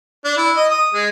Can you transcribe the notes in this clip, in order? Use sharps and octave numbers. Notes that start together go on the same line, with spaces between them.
D4
E4
D#5
D#6
G#3